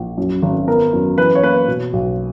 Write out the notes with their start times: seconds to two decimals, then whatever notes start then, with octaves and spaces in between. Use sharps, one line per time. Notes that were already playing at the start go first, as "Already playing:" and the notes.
Already playing: A#1
0.18 F#2
0.43 G#1
0.67 B3 A#4
0.93 F#2
1.17 E3 B4
1.35 C#5
1.43 A#3 B4
1.68 B2
1.93 B1